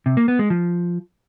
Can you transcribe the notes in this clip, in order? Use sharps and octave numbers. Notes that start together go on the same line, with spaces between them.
C3
A#3
B3
G#3
F3